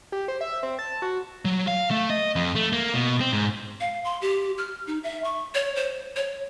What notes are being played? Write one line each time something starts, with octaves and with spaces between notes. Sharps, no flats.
G4
C5
E5
C4
A5
F#4
F#3
F5
A3
D#5
F2
A3
A#3
B2
C4
G#2
F5
C6
G4
F6
D#4
E5
C#6
C#5
C5
C#5